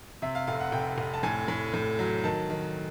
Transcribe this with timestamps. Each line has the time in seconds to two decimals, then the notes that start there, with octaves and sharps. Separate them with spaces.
0.22 C3 E5
0.35 F5
0.47 F1 F5
0.60 F#5
0.72 F1 G5
0.98 F1
1.14 A5
1.23 A2 G#5
1.48 A2
1.74 A2
1.99 F#3
2.24 D#3 A5
2.50 D#3